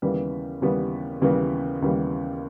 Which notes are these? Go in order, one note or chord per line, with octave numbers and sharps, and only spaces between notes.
D#2 C#3 E3 G3 B3
D#2 C#3 E3 G3 B3
D#2 C#3 E3 G3 B3
D#2 C#3 E3 G3 B3